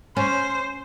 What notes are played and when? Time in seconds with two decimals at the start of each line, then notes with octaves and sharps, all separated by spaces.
0.17 C#4 C5